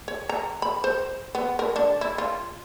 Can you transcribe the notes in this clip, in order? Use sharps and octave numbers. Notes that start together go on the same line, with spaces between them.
C#5
A#5
B5
C5
B3
A#4
D4
E4
F4